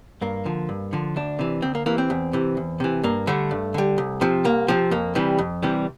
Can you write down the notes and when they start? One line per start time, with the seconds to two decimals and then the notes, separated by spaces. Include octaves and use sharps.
0.21 G2 A#3
0.45 D3 F3
0.69 G2
0.93 D3 F3
1.16 D2 D4
1.39 C3 E3
1.62 D2 C4
1.75 A#3
1.86 C3 E3 A#3
1.98 C4
2.10 E2
2.33 C3 E3
2.57 E2
2.80 C3 E3
3.03 G2 A#3
3.27 D3 G3 A3
3.51 G2
3.74 D3 G3
3.98 C2
4.21 C3 F3
4.45 C2 A#3
4.68 C3 F3 C4
4.91 F2 A#3
5.15 C3 E3 G3
5.39 F2
5.63 C3 E3 G3